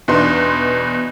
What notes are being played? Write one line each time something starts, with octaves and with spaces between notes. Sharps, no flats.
E2 B2 D4 D#4 B4 C6